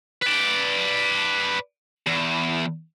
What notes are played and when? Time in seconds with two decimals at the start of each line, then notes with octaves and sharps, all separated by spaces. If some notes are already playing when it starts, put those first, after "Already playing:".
0.22 B4 D5
2.06 E2